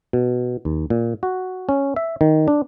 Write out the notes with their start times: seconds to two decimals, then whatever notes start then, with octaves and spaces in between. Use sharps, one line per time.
0.13 B2
0.65 D#2
0.90 A#2
1.23 F#4
1.69 C#4
1.96 E5
2.21 D#3
2.48 D4